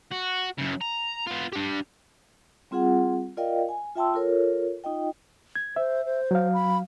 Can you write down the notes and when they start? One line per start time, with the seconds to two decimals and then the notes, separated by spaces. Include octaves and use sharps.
0.11 F#4
0.59 F#2 C#3
0.81 A#5
1.27 B3 F4
1.53 D4 G4
2.71 G3 C4 F4 G#4 F#5
3.37 F4 A#4 D5 D#5 F5 G5
3.69 G#5
3.95 F4 E5 G5 A5 C6 E6
4.14 F4 A4 A#4 C#5
4.84 D#4 F4 D#5 G5
5.55 G#6
5.76 C5 E5
6.05 C5
6.31 F#3 F5
6.54 B5